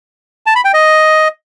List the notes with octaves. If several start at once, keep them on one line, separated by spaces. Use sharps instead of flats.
A5
B5
G5
D#5